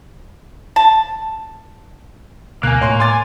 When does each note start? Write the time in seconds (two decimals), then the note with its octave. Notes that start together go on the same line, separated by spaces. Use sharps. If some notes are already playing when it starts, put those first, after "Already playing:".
0.76 A5
2.63 D2 B2 A#3 G#5 F#6
2.81 A2 C#5 G#5 C6
3.00 G#5 C6 D6 A6